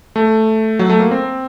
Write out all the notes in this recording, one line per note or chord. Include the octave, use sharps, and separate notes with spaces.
A3
F#3
A3
A#3
C4